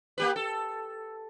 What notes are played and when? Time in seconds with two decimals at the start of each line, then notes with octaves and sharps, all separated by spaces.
0.18 A#3 G4 B4
0.36 A4